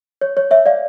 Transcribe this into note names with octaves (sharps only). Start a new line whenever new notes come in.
C#5
C#5
C#5 E5
D5 F5